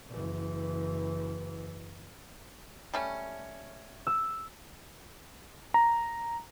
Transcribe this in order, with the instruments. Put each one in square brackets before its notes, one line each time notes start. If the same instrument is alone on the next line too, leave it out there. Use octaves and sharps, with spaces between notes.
[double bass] F#1 E3
[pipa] G3 A3 C#4
[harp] E6
[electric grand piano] A#5